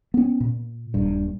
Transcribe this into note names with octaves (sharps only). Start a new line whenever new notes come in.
B3 C#4
A#2
D#1 G2